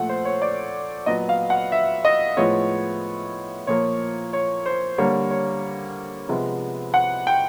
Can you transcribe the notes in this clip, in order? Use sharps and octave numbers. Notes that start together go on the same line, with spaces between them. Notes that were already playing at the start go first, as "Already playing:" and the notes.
Already playing: A#2 F3 A3 F#5
C5
C#5
D5
A#2 F#3 B3 D#5
F5
F#5
E5
D#5
A2 F3 G#3 B3 C#5
A#2 F3 A#3 C#5
C#5
C5
D3 G3 A#3 C#5
C#5
C3 F3 G#3 B3
F#5
G5